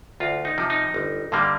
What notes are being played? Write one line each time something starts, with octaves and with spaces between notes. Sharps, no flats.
D2 F4
D#4
C3 F3
D#4
G1
G2 D3 G3 A#3